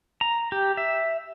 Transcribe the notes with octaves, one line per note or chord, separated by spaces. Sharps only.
A#5
G4
E5